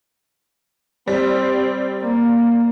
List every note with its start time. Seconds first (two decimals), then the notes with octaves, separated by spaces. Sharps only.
1.08 G3 C4
2.01 A#3